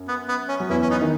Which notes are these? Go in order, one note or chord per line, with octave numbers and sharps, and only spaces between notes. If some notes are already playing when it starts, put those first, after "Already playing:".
Already playing: F#2
B3
B3
C#4
F#3
E2 E3 C#4 E4
C#4
B3 D#4
D#3